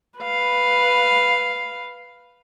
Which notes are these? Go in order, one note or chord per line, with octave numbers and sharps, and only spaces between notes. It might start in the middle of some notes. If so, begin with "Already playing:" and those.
B4 F5